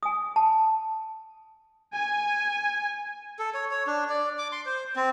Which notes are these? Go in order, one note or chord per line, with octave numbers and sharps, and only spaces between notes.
G#5 D#6
A5
G#5
A4
C#5
C#5
D4
D5
D6
C6
C5
C4